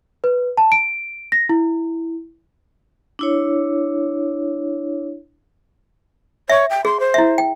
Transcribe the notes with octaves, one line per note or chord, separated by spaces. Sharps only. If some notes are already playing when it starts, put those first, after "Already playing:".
B4
A5
D7
A#6
E4
D4 E4 C#5
C#5 E5
G5
G#4 C6
C5
E4 E5
G5